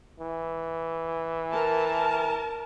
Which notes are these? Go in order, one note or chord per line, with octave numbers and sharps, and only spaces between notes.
E3
A#4 A5